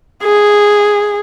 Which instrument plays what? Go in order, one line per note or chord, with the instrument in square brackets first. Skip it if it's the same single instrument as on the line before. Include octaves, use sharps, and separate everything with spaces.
[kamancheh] G#4